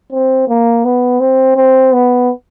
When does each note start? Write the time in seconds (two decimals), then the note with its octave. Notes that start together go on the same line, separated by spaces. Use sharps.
0.12 C4
0.48 A#3
0.85 B3
1.20 C4
1.56 C4
1.93 B3